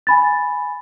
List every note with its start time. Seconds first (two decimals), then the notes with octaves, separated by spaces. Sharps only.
0.07 G#5 B5 A6